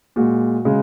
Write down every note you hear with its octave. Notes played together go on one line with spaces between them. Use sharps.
A#2 G#3 F#4
C#3 G#3